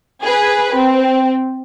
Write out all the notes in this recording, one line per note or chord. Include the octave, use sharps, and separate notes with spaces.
G#4 B4
C4